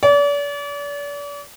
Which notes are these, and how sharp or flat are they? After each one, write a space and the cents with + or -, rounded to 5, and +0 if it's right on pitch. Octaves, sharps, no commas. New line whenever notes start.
D5 -40